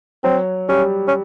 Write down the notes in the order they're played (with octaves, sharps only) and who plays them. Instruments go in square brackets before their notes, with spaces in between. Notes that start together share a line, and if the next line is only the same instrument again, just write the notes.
[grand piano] F#3 [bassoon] C4
[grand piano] G3 [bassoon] C#4
[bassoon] C#4